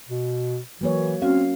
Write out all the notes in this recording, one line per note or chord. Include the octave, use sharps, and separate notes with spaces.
B2
E3 F#3 A#3 C#5
C4 C#4 F#4 F5